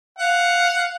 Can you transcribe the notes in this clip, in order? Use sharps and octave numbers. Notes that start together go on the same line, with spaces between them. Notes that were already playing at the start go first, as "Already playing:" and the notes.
F5 F#5